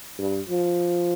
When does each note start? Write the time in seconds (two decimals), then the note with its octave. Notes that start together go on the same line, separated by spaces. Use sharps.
0.19 G2
0.49 F3